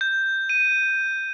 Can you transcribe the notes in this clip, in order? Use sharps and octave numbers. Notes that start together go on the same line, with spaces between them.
G6
D#7